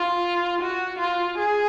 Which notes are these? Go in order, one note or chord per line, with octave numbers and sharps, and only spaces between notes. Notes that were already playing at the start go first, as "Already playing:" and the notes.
Already playing: F4
F#4
F4
G#4